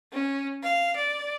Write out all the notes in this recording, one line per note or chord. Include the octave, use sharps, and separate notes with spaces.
C#4
F5
D5